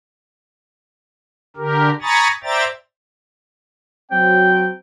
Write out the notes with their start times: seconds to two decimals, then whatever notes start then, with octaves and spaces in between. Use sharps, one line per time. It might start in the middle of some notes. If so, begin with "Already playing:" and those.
1.57 D3 G4 A#4
2.02 G#5 A#5 B5 C#6 D#6 A6
2.43 C5 D5 E5 G5 A#5 A6
4.11 F#3 C4 G5